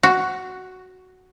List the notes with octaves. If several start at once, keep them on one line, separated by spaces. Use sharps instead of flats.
F#4